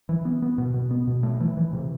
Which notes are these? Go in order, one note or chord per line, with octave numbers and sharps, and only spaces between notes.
E3
B3
B3
B2
B2
B3
B2
A3
E3
E3
C3